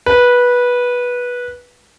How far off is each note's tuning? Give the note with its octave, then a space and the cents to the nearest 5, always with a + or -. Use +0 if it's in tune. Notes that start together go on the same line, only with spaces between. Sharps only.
B4 -15